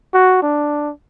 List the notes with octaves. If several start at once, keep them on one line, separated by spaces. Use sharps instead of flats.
F#4
D4